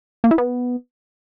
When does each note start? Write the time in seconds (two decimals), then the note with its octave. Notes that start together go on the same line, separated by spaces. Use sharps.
0.24 A#3
0.31 E4
0.38 B3